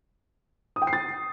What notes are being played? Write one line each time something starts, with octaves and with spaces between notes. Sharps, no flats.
D#6
G5
C7
A6